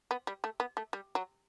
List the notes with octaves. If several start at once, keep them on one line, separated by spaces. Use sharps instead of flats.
B3
G3
A3
B3
A3
G3
F#3